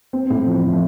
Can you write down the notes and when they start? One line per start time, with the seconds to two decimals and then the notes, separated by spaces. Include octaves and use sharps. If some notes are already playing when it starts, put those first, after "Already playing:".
0.13 C4
0.30 A2
0.47 F3
0.64 F3